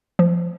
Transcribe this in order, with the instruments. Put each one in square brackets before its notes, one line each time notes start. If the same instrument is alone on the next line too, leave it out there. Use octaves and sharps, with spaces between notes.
[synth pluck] F3